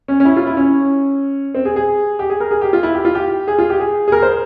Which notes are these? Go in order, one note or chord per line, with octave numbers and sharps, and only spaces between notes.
C#4
C#4
E4
F4
E4
C#4
C4
G#4
G#4
G4
G#4
A#4
G#4
G4
F4
E4
G4
F4
G4
G#4
F4
G4
G#4
G#4
A#4
C5